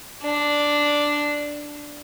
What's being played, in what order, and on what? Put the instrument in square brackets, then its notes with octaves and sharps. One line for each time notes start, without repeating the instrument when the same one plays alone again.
[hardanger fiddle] D4